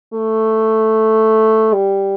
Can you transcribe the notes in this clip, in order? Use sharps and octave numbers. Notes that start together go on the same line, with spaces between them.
A3
G3